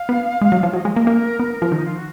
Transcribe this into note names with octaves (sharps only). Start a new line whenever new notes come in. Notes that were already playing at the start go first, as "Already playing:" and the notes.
Already playing: F5
B3
G#3
F#3
F3
F#3 D#5
G#3
A#3
A#3 A#4
B3
F3
D#3 D#4
F4
F#4